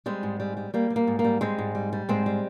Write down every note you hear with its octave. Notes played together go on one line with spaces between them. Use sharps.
G3 G#3 C4
G#2
G3
G3
G3 A#3
G3
A#3
G#2
A#3
G3
G3 G#3 C4
G#2
G3
G3
G#2 G#3 C4
G3